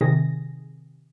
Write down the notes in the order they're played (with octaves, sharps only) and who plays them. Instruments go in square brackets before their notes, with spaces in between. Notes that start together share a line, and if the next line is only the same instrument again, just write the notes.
[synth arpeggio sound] C3 D#3 G#4 A#6